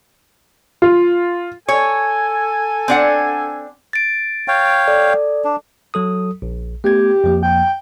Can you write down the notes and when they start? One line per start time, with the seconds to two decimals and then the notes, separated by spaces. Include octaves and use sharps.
0.82 F4
1.69 A4 C#5 G#5
2.88 C4 D4 F#5
3.93 A6 D7
4.48 C#5 F5 G5
4.88 A4 D5
5.44 D4
5.94 F#3 A4 D#6
6.42 A#1
6.84 A3 B3 G4 G#6
7.24 F2 F3 A#3
7.43 G5